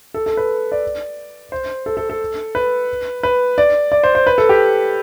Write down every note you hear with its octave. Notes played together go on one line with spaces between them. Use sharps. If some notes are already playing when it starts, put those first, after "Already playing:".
A4
A4
B4
D5
C5
A4
A4
A4
B4
B4
D5
D5
C5
C5
B4
A4
G4